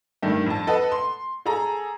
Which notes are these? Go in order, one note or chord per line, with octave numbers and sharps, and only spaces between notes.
G2 D#3 A3
F2 A5
A4 B4 D#5 F#5
C6
G#4 A4 G#5 A#5